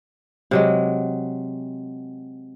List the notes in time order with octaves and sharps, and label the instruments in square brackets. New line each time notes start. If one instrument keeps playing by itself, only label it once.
[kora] C3 F#3 G#3